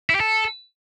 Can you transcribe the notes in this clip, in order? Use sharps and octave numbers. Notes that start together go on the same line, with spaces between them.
E4
G4
A4